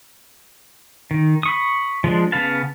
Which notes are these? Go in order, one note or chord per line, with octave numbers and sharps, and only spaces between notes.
D#3
B5 C#6 D#6
F3 G#3 D4
C#3 B3 B4 F5 A5